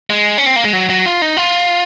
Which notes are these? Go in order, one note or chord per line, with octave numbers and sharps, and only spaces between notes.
G#3
C#4
C4
A#3
G#3
F#3
F#3
F4
D#4
F4